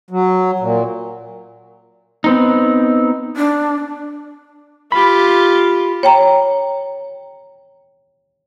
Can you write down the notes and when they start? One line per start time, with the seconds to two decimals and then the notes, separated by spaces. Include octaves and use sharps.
0.10 F#3
0.60 A#2
2.24 B3 C4 D#4
3.37 D4
4.92 F4 G4 B5
6.03 C#5 G5 A#5